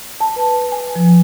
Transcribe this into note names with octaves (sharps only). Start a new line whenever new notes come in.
A5
B4
G#5
F3